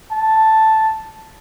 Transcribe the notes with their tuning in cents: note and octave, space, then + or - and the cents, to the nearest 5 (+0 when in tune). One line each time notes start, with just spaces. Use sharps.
A5 +0